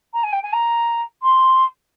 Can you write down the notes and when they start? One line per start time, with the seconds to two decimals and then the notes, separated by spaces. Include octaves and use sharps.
0.13 A#5
0.23 G#5
0.32 G5
0.42 G#5
0.52 A#5
1.22 C6